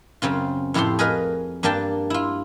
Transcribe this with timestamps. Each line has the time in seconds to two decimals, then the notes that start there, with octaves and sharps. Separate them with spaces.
0.22 F#2 C#3 C4 F4
0.74 F2 A2 E4 G4 C5 C6
0.99 G#4 A#4 B4 D#5 F5 A#5
1.63 G2 A#3 D4 G5 A5
2.10 E4 F4